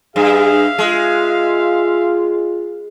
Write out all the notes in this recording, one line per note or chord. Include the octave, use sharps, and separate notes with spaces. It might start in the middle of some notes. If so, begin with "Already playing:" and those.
G2 G#4 E5 F5
G#3 F4